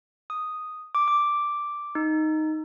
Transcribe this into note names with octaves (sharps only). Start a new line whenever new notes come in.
D#6
D6
D6
D#4